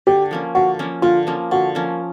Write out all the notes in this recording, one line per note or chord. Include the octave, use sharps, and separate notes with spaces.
D3 G4
F3 A#3 C#4
D3 F#4
F3 A#3 C#4
D3 F4
F3 A#3 C#4
D3 F#4
F3 A#3 C#4